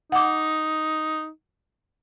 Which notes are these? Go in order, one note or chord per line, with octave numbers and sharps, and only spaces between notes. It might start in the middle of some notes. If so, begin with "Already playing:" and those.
D#4 F#5 D6